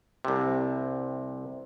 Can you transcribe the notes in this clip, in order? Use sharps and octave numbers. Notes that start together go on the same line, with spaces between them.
C2 C3